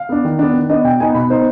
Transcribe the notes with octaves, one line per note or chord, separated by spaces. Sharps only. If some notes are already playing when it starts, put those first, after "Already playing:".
Already playing: F5
B3 D4
D#3
B3 D4
D#3
B3 D4 D#5
B2 G5
B3 D#4 G#5
B2 B5
B3 D#4 C5